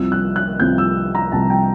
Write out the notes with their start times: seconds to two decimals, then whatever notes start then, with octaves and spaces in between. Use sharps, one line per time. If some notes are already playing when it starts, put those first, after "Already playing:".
Already playing: C2 C3 F3 E6
0.12 F#6
0.36 F#6
0.60 C2 C3 F3 G6
0.78 E6
1.15 A#5
1.32 C2 C3 F3 A5
1.50 G5